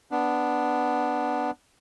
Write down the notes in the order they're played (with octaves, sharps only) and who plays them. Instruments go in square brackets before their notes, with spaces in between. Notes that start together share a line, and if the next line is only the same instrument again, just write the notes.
[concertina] B3 D4